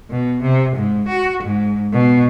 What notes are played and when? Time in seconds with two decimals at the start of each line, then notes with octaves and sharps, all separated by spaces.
0.10 B2
0.42 C3
0.76 G#2
1.08 F#4
1.43 G#2
1.93 B2